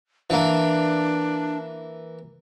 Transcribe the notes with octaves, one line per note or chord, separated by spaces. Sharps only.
E3 A#3 D4